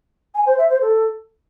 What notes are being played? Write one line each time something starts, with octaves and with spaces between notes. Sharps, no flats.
G#5
C5
E5
C5
A4